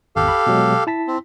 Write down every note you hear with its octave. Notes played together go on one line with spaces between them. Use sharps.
G#1 E2 G4 A4 F5
B5
B2 F#3 G#3
E4 A5 B6
C4